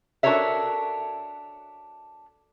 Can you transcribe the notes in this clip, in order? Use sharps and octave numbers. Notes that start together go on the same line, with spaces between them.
D4 F#4 A4 A#4 C#5 E5